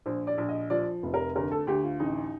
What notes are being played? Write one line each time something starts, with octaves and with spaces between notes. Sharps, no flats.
A#1 C5
D5
A#1
D#5
F3 D5
F1
A#4
D2 A#4
A4
D2 G4
F4
A1 D#4